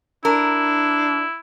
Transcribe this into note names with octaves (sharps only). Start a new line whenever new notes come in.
D4 E4 A#4